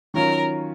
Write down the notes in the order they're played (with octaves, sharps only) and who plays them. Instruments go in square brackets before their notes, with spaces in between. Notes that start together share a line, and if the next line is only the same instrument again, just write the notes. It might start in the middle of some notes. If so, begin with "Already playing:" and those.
[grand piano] D#3 F#3 C#4 F4 [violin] A#4